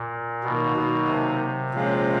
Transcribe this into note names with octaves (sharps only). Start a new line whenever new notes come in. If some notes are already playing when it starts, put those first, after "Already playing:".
Already playing: A#2
B2 D#3 F#3 A#3 D#4
B2
C3
A#2 F3 G#3 C#4 F4